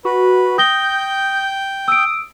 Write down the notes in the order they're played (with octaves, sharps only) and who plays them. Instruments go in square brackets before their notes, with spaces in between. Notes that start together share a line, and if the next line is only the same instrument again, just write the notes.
[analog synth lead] F#4 [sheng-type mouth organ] B4
[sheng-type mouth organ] G5 [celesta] D#6 A#6 G7 [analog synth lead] G6
[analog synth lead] D#6 [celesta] E6 D7